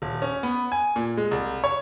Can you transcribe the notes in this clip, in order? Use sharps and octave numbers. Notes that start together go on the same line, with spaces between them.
D#1
C#4
B3
G#5
A#2
G#3
C2
C#5